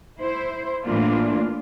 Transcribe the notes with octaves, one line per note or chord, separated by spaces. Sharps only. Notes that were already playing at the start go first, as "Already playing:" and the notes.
E4 C5
A2 E3 A#3 D4 F4